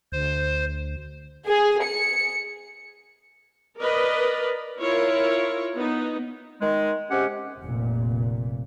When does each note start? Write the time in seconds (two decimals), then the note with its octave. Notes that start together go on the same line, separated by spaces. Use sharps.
0.12 D2 C5
1.47 G#4
1.84 C#7
3.78 A#4 B4 D5 D#5
4.80 E4 F4 A#4 C#5
5.74 B3 D#4
6.61 D#3 G#3
7.11 C3 G#3 C#4 G4 F#5
7.62 F1 A#2